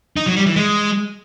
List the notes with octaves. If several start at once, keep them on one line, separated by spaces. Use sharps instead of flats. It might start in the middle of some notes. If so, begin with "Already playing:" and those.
D#4
F#3
G3
E3
G#3